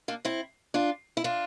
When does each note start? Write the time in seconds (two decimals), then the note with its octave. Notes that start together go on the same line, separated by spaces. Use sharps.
0.08 A#3 D4
0.25 C4 E4
0.74 D4 F4
1.17 E4
1.24 D4 F4